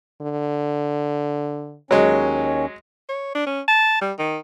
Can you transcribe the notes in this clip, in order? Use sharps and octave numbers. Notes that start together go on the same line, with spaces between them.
D3
D#2 F#3 G#3 C#4
C#5
D4
C#4
A5
G3
D#3